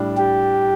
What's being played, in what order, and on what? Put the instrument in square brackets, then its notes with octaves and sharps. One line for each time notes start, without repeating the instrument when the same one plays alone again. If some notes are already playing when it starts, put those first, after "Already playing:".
Already playing: [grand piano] A2 G3 D4
[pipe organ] G4